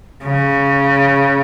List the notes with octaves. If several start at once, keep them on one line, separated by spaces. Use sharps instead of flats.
C#3